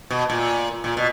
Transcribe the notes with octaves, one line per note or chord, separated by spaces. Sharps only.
B2
A#2
A#2
B2